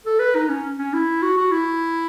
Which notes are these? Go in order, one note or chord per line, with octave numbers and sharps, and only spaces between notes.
A4
B4
D#4
C#4
C#4
E4
F#4
F#4
E4